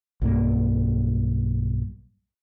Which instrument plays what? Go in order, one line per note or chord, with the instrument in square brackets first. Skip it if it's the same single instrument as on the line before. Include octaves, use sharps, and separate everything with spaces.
[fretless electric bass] B1 G2 A#3